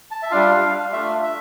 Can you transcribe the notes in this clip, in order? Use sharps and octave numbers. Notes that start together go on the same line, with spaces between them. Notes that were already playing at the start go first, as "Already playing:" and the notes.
A5
E5
G3 D4 F4 F5
A3 D4 F4 E5
E5